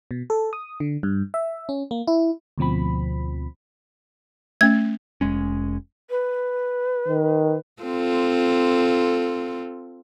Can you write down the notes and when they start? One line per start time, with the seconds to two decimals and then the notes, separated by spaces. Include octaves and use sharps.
0.11 B2
0.30 A4
0.53 D#6
0.80 D3
1.03 G2
1.34 E5
1.69 C#4
1.91 A#3
2.07 E4
2.58 D2 B2 F3 C4 B5
4.61 A3 C#4 G#6
5.21 F1 G#3 C#4
6.10 B4
7.08 D#3
7.82 C4 F4 A4